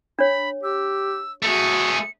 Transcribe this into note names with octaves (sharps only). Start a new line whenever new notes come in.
D4 C#5 B5
G4 E6
A3 F#4 G#4 C#7